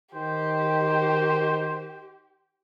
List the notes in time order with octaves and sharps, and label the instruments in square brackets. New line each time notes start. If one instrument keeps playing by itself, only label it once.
[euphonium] D#3 [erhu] G4 [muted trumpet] C5